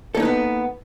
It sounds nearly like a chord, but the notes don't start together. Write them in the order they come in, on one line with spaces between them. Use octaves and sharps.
A4 A#3 D#4 B4 B3